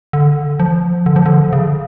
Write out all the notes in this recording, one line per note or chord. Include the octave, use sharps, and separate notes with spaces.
D3
F3
D3
F3
D3
C#3